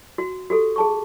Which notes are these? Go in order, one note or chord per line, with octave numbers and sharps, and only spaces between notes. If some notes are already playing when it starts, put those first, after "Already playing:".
F#4
F#4 G4 A4
G#4 A5 C#6